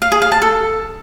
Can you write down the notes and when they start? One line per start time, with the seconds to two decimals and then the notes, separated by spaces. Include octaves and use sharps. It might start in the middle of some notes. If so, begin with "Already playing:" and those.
0.02 F5
0.12 G#4
0.22 F5
0.32 A5
0.42 A4